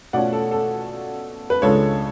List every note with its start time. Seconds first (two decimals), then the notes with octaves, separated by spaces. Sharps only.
0.13 B2 A3 C#4 F4 D5 F#5
0.33 A4
0.51 A4
1.50 B4
1.62 C#2 C#3 G#3 D4 F4 A4 C#5